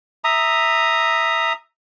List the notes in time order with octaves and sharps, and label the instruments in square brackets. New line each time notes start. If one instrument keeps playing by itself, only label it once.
[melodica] E5 A#5 D#6